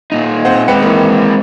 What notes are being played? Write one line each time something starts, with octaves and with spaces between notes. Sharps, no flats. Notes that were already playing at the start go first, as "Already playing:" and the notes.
A#2 D#4
C4 C5 F#5
G#3 C4 B4 G5 C#7
E3 A#3